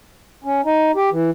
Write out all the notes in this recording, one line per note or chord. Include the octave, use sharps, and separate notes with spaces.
C#4
D#4
G4
E3